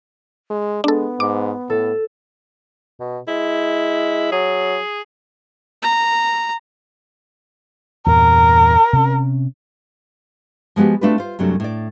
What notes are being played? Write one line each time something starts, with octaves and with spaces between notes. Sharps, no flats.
G#3
G#3 B3 D4 A4
G#2 D6
A2 A4
B2
G#3 E4
F#3 G#4
A#5
E2 G2 A#2 A#4
C3 C#4
F3 G#3 B3 F#4 G4
A3 C4 D4 F4 F#4 B4
F4 C5
F#2 C3 F#3 G3 A3 D4
A2 D4 D5